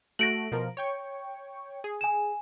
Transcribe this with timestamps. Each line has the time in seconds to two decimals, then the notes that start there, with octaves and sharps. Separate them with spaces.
0.19 A3 F#4 A#6 D7 F#7
0.52 B2 F3 A#4
0.77 C#5 G5 C#6
1.84 G#4
2.01 G#5 E7